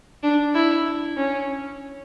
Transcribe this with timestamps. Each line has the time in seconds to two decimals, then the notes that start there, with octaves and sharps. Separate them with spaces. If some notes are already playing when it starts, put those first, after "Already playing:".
0.23 D4
0.54 E4
1.17 C#4